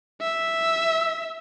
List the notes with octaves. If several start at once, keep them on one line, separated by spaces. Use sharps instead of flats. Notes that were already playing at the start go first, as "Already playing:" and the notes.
E5